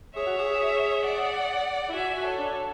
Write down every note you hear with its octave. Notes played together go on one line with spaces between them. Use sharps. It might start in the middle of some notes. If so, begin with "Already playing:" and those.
G#4 C#5 E5
F#4
G#4
D5 F#5
E4
F#4 E5 G#5
F#4
A4 C#5
D4